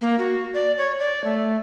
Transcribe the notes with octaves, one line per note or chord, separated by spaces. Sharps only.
A#3
F#4
D5
C#5
D5
A3